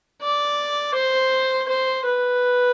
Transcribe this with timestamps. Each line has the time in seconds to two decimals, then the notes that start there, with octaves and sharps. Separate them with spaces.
0.22 D5
0.94 C5
1.68 C5
2.05 B4